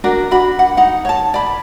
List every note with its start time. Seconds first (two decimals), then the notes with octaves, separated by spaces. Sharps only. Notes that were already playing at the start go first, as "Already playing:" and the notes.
0.04 D4 F#4 A#4 D5
0.31 D4 F#4 B5
0.59 F#5
0.77 D#4 F#5
1.05 C#5 A5
1.34 D5 B5